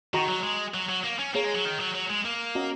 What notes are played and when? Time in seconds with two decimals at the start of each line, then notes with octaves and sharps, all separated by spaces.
0.14 D#3 F#4 D#5 A#5 C#6
0.28 F#3
0.43 G#3
0.74 F#3
0.89 F#3
1.04 A#3
1.19 C#4
1.34 A#3 G#4 C#5 A#5
1.45 G#3
1.55 F#3
1.65 D#3
1.80 F#3
1.95 F#3
2.10 G#3
2.25 A#3
2.55 C#4 F#4 D#5 A#5